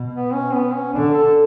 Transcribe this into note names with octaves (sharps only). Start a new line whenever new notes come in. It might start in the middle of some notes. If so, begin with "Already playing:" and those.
Already playing: B2
B3
C#4
B3
C#4
D3 D4
A4